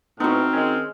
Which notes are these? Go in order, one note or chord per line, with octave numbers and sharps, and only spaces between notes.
A2 B3 C4 D#4 F#4 F6
D#3 G#3 C#4